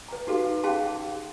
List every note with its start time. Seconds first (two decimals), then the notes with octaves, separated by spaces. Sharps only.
0.09 B4 A#5
0.27 D#4 F#4 G4 A4 B4 F5
0.63 C#4 G4 G#4 F5 A5 C6